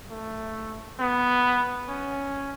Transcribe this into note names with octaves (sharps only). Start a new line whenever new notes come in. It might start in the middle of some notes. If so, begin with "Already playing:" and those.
A3
B3
C#4